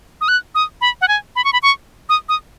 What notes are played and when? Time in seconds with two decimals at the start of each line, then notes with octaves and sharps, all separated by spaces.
0.21 D#6
0.28 F#6
0.55 D#6
0.81 B5
1.01 F#5
1.08 G#5
1.36 B5
1.44 C#6
1.53 B5
1.63 C#6
2.09 D#6
2.29 D#6